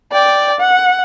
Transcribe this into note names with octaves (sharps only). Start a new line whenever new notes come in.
D5 G5
F#5